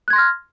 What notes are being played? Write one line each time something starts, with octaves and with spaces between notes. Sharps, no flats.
C6 F6 F#6 G#6 A#6